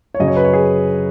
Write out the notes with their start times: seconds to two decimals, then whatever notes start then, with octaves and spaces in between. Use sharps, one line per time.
0.14 C#5
0.19 F#2 C#3 F#3 D#5
0.28 C#5
0.36 B4
0.45 C#5
0.53 G#4